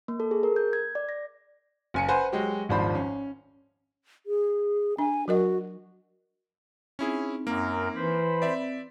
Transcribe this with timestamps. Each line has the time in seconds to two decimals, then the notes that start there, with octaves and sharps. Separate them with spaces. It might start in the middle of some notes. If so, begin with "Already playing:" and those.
0.08 A#3
0.20 A4
0.31 G#4
0.43 A#4
0.56 G6
0.73 G#6
0.95 D5
1.09 A#6
1.94 F#1 G#5 C#7
2.08 B4 C5 F#5 G#5
2.32 F#3 G#3 F#4 G4
2.69 D#1 G#1 F3 D4 C5 B5
2.95 C#4
4.26 G#4
4.98 D4 G#5
5.28 F#3 F#4 A#4 D#5
6.99 C4 C#4 D#4 E4 G#4
7.47 F#2 A#3 A#4
7.96 E3 C5 B5
8.42 C4 D5 E5